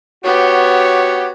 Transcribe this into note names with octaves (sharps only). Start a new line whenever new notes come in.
B3 F#4 G4 C#5